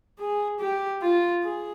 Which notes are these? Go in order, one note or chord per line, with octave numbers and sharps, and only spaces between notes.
G#4
G4
F4
G#4